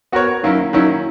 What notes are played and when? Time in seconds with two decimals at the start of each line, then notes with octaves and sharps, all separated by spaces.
0.12 B3 F#4 A#4 C#5
0.43 D#3 F#3 A#3 C#4 E4
0.73 D#3 F#3 A#3 C#4 E4